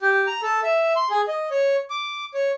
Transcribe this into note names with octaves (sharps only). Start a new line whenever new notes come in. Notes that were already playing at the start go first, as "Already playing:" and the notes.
G4
A#5
A4
E5
C6
G#4
D#5
C#5
D6
C#5